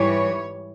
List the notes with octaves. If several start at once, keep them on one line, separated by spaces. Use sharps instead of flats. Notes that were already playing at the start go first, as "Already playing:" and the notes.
Already playing: G#2 E3 G3 C#5